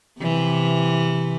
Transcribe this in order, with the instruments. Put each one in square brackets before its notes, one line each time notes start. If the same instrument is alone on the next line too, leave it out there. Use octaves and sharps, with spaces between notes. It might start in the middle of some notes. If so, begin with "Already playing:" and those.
[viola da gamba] C3 E3